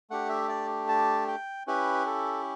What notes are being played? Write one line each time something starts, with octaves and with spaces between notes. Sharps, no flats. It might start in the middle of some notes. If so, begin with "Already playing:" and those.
A3 D4 G4 F#5
E5
D5
A5
G5
C#4 E4 G4 B4
A4